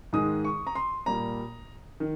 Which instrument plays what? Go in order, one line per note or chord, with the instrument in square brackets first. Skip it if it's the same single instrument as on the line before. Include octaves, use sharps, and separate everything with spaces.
[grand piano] G#2 D#3 G#3 D#6
C#6
A#5
C6
A#2 G3 A#3 A#5
D#3